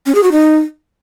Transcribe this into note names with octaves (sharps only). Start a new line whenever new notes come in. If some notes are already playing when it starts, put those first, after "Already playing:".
C#4
G#4
F#4
D#4